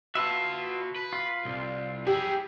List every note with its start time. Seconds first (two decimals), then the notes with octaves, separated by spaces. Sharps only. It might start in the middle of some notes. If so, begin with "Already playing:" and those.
0.15 F4 F#4 B4 E5 A5
0.96 B4
1.13 F4
1.45 C2
2.07 E4 G4 G#4